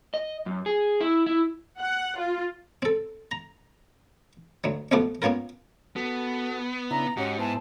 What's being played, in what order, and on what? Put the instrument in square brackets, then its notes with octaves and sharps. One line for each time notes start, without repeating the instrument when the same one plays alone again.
[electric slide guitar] D#5
F#2
G#4
E4
E4
[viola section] F#5
F4
[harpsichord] C4 A4
A#5
D2 F#3
C2 B2 F3 A3 B3 D6
A#3 B3 C#4 F4 A#4
[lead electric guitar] B3 [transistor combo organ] F#4 A4
[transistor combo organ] C#3 D4 E4 [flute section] A#5
[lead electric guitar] G#2 [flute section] C#4 F#5 [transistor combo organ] F#4 G4 D#5
[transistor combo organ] B3 E4 C5 [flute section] G#5 A5